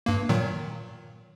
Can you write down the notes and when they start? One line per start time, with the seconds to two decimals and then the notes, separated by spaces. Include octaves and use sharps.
0.06 G2 A#3
0.29 A#2 D#3 F#3